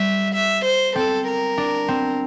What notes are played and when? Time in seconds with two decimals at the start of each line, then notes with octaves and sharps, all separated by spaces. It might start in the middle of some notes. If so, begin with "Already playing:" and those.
Already playing: G3 E5
0.34 E5
0.64 C5
0.95 C4 A4
1.27 A#4
1.58 D4
1.88 C4